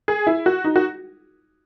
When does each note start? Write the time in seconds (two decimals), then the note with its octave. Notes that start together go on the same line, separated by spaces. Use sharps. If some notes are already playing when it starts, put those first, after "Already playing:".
0.08 G#4
0.27 E4
0.46 F#4
0.64 D#4
0.76 F#4